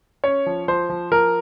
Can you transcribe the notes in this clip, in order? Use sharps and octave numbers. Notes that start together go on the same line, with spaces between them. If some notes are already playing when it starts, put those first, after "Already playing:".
C#4 C#5
F3
F3 C5
F3
F3 A#4